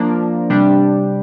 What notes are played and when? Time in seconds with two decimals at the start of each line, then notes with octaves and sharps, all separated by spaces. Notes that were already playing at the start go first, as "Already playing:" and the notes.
Already playing: F3 A#3 D4
0.50 C3 G3 D4 G4